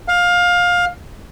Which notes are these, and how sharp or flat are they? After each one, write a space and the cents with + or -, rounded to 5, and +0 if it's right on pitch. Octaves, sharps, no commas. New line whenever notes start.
F5 +20